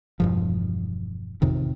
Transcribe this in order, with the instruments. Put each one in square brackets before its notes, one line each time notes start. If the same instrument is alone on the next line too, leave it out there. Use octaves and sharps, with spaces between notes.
[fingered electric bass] E1 G2 F3
A1 F2 C3 D#3